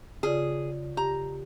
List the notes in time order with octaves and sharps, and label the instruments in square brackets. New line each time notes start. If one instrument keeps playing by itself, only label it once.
[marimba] C#3 F4 D5 [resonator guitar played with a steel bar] G#4
[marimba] G4 [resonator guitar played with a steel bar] A#5